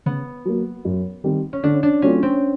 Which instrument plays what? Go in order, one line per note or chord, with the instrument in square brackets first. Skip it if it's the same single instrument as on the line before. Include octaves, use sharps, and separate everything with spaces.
[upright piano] C#3 [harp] B3
[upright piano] F#3 A#3
F#2
D#3 G3 C4
[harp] C#4
[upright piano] D3 [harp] D4
[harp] D4
[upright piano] F#3 A3 C4 F4 [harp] C#4
[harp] C4